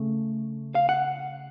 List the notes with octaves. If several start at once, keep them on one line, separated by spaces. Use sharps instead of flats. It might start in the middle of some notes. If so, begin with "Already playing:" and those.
Already playing: C#3 A3
F5
F#5